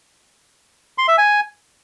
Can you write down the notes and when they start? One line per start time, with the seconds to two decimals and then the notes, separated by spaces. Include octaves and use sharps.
0.98 C6
1.08 E5
1.18 G#5